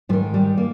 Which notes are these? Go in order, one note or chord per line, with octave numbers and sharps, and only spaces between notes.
G#2 D#3 F3
G3
A#3